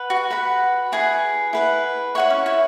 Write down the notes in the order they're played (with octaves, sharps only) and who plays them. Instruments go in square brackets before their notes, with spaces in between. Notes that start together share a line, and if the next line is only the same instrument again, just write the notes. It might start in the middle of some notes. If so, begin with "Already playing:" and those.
Already playing: [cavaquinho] B4 F#5
[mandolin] F#4
[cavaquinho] B4 F#5 B5
[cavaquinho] E4 B4 F#5 [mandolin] G#4
[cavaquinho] E4 B4 F#5
[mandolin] E4 [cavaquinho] C#5 F#5 C#6
[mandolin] C#4
E4